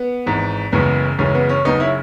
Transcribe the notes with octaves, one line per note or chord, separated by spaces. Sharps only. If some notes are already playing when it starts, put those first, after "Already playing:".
Already playing: B3
G#1 G#2 E3
F#1 F#2 C#3 E3 G#3 B3
F#1 F#2 C#3 E3 G#3 C#4
B3
C#4
F#1 F#2 C#3 B3 D#4
C#4 E4